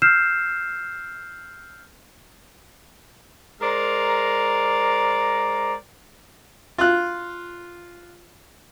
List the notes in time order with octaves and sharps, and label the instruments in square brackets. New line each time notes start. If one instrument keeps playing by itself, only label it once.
[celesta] E6 F6 G6 C7 E7
[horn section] G#3 A#4 C5 D5 A#5
[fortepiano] F4 F#6